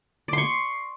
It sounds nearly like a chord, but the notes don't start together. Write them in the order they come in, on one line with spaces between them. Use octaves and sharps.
D5 C6 C#6